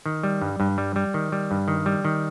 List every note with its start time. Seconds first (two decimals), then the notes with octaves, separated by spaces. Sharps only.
0.06 D#3
0.23 G3
0.42 G2
0.60 G2
0.78 G3
0.96 G3
1.14 D#3
1.32 G3
1.51 G2
1.68 D#3
1.86 G3
2.05 D#3